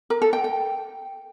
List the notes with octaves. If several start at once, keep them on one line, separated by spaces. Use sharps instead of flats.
A#4
A4
G5
G5